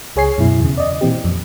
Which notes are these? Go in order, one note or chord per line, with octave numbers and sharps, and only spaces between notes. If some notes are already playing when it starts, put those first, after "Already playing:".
C#2 G#4 C#5 G#5 C7
F#2 B2 E4
E2 C#3
D5 D#5
A#2 E3 C4 G4
F2